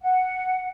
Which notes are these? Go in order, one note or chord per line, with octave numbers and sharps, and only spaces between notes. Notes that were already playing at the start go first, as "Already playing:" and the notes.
F#5